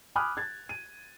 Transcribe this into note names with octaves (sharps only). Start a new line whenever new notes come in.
G#5 B5 D6 D#6 F6 F#6
G#6 A6
D#7